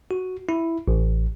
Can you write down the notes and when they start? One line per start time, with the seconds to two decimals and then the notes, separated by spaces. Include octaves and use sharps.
0.11 F#4
0.49 E4
0.88 A1